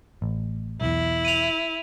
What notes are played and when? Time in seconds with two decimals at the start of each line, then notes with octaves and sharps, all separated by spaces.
0.22 A1
0.81 B1 E2 E4
1.25 D#7 F7